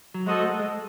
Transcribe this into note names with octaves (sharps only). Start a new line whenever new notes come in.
F#3
G#3 F#4 A4 C5 D#5
A3
G#3